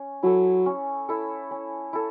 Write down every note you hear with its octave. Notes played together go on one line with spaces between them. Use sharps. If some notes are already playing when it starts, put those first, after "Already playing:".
Already playing: C#4
F#3 E4 A4
C#4
E4 A4
C#4
E4 A4